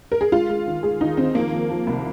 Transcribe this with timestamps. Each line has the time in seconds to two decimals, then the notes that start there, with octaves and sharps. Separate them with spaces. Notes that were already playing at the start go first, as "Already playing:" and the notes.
0.12 A#4
0.21 G#4
0.32 G#3 F4
0.49 G#3
0.67 D#2
0.83 G#3 G#4
1.01 D#2 D#4
1.17 D#2 C4
1.35 F3 A#3
1.52 F3
1.70 F3
1.87 C2